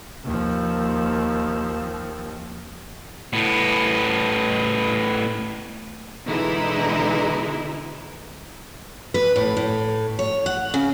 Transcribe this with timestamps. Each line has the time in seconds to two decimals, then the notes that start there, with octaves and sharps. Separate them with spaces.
0.24 D#2 F3
3.33 A2 B3
6.25 B2 D3 E3 G#3 D#4 E4
9.14 B4
9.36 A2
9.57 A2
10.19 C#5
10.46 F#5
10.74 C#3